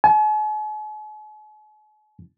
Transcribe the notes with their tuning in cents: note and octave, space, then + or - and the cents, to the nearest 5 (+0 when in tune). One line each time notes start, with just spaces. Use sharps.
G#5 +45